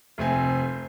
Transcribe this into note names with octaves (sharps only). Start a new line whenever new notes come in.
F1 A3 C4 G#5